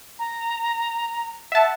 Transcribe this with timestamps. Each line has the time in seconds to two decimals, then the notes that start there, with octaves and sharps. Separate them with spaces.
0.19 A#5
1.52 E5 F#5 A5